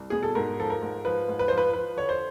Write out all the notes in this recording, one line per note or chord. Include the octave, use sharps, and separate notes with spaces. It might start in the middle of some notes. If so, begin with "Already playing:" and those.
Already playing: C2
B2 G#4
A4
G#2 A#4
F3 A4
A#4
G#2
F3 B4
G#2
B4
F3 C5
B4
F3 B4
D3 C#5
C5